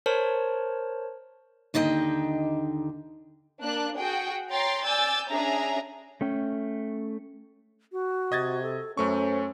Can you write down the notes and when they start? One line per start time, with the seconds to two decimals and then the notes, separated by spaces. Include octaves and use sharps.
0.06 A#4 C5 C#5 A5
1.74 D#2 D3 D#4 D#5 G5
3.61 A#3 D4 F#6
3.97 F#4 G#4 G5
4.51 C#5 G5 A#5 C6 A6
4.85 D5 G#5 E6 G6 A6
5.29 C#4 D4 G#4 E5 A#5
6.21 A3 C#4 G5
7.92 F#4
8.32 C3 D#5 G#6 A6
8.63 A4
8.97 F#2 A3 C#4 C5 C#6